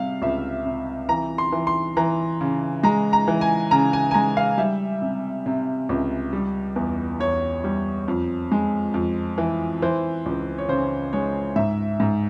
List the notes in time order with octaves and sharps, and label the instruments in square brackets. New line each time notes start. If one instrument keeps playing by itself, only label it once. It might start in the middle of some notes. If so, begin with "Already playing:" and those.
Already playing: [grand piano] C3 G3 F5
C#2 E5
C3
E3 A#5
C6
E3
C6
E3 A#5
C#3
G#3 A#5
A#5
E3
G#5
C#3 A#5
G#5
G#5
G#3 A#5
F5
G3 E5
C3
C3
C#2
G3
E2
E2 C#5
G3
F2
G#3
F2
E3
E3 C5
C#2
C#5
C#3 C5
G#3 C#5
G#2 E5
G#2